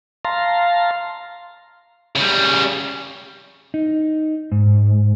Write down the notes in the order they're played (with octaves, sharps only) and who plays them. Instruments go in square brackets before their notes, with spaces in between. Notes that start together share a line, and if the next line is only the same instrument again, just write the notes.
[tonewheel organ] F5 A5 A#5 C6
[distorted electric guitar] C#3 G3
[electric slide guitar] D#4
G#2